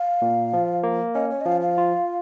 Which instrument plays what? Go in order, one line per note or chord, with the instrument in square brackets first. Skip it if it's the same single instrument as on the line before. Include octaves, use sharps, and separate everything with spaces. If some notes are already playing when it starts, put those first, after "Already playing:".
Already playing: [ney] F5
[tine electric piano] A#2
F3
A#3
[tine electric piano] C#4 [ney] D#5
[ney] C#5
D#5
[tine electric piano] F3 [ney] F5
[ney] F5
[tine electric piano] F4